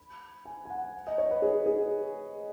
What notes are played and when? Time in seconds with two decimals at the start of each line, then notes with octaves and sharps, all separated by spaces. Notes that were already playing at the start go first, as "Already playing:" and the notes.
Already playing: B5
0.45 G#5
0.65 G#5
0.70 F#5
1.07 D#5
1.18 C#5
1.31 B4
1.42 G#4
1.66 G#4